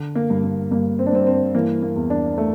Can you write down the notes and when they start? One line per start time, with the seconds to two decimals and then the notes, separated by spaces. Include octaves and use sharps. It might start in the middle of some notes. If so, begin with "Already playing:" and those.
Already playing: D3
0.15 A#3
0.30 G2
0.44 A#3
0.71 G2 A#3
0.99 C4
1.07 D4
1.13 G2 C4
1.27 C4
1.55 E3 A#3
1.82 A#3
1.96 E2
2.10 D4
2.38 A3